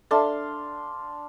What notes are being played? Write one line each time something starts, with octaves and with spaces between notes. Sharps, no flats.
D4 A4 E5 F5 A5 C6